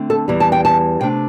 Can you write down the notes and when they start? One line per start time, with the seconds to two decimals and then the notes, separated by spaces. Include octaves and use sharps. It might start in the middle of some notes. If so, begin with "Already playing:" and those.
Already playing: D3 A3 C4
0.10 A4
0.28 E2 E3 G3
0.40 A5
0.52 G5
0.65 A5
1.01 C3 A3 D4 G5